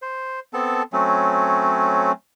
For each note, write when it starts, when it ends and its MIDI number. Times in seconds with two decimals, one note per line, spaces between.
0.02 0.40 72
0.53 0.82 59
0.53 0.82 60
0.53 0.82 69
0.53 0.82 81
0.93 2.12 54
0.93 2.12 57
0.93 2.12 60
0.93 2.12 61